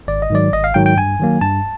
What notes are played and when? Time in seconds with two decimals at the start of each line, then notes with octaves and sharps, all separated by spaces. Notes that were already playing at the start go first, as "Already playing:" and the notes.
0.08 G#1 D5
0.22 D#5
0.30 G#2 D#3 F#3 D5
0.53 G#1 D#5
0.64 F5
0.74 G#2 D#3 F#3 G5
0.86 G5
0.97 G2 G#5
1.20 D#3 F#3 A#3
1.41 G2 A5